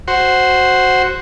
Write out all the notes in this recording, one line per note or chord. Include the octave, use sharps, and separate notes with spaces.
F#4 C5